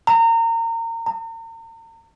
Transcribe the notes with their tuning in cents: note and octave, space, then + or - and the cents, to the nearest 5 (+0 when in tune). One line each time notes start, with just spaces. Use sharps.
A#5 -30
A#5 -40